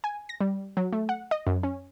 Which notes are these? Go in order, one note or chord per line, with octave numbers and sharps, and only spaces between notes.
G#5
A#6
G3
F#3
A3
F#5
D#5
F#2
C#4